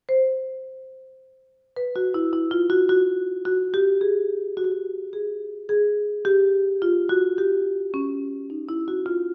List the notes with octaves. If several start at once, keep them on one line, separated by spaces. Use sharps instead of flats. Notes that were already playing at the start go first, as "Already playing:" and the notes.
C5
B4
F#4
E4
E4
F4
F#4
F#4
F#4
G4
G#4
F#4
G4
F#4
G#4
G#4
G4
F4
F#4
G4
C#4
D#4
E4
F#4
F4